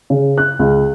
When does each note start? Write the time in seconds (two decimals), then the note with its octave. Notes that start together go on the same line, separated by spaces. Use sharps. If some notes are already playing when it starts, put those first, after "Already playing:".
0.10 C#3
0.38 F#6
0.59 C#2